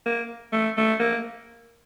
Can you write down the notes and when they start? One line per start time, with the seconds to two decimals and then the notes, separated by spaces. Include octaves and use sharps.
0.06 A#3
0.52 A3
0.77 A3
1.00 A#3